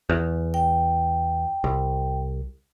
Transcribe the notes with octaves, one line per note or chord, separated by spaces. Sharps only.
E2
G5
C2